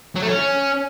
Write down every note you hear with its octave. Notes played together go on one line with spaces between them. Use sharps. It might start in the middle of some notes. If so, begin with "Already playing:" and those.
F#3
A3
C#4